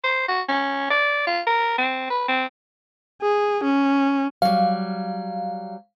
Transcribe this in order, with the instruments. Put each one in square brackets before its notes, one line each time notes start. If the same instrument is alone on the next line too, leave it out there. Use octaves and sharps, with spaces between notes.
[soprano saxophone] C5
F#4
C#4
D5
F4
A#4
C4
B4
C4
[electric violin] G#4
C#4
[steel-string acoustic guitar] F#3 G3 [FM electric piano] F5